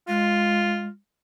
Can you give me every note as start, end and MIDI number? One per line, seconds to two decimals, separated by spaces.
0.08 0.86 56
0.08 0.88 65